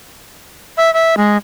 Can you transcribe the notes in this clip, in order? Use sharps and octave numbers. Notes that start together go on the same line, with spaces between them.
E5
E5
G#3